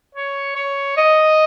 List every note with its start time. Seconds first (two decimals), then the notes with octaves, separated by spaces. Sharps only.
0.15 C#5
0.56 C#5
0.97 D#5